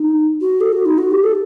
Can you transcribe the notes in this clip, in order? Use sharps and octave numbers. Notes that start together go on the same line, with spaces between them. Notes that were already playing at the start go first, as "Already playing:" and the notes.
Already playing: D#4
F#4
A4
F#4
D#4
F#4
G4
A4